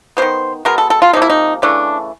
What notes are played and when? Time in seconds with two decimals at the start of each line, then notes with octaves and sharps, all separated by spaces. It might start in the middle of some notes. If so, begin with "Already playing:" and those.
0.17 G3 B3 C5
0.22 D#3
0.65 B2 G#3 B3 A#4
0.78 A4
0.90 A4
1.02 F4
1.13 C3 F3 A#3 D#4
1.22 E4
1.30 D#4
1.62 C#3 E3 A3 D4